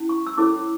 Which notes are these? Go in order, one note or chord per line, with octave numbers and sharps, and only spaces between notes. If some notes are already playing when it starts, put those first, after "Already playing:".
Already playing: C#4 E4
C#6
E6
C#4 E4 A4 C#5 D6